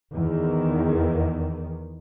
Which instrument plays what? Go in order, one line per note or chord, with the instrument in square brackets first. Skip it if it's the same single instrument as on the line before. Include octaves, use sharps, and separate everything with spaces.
[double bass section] E2 D#3